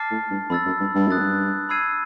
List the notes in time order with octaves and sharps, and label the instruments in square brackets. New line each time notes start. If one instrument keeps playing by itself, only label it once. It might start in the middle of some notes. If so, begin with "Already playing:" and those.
Already playing: [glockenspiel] A5 D6 F6 A6 C7
[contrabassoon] A2
G2
[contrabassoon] F2 [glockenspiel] B5 E6 A6
[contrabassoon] F#2
G2
G2
[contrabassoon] F#2 [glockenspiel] D#6 F#6 A6
[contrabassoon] G2
[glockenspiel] B5 E6 G#6 C7 D#7